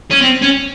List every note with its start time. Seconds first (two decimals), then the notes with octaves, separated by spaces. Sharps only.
0.11 C#4
0.21 C4
0.42 C#4